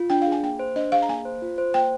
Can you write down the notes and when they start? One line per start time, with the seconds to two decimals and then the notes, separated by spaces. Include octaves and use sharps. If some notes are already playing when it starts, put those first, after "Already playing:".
Already playing: F4
0.10 D4 G5
0.22 F5
0.27 G#4
0.32 G#5
0.43 A#3 G5
0.59 C5
0.76 D4 D#5
0.92 G#4 F5
1.02 A#5
1.09 A#3 G#5
1.25 C5
1.42 F4
1.58 C5
1.74 A#3 G5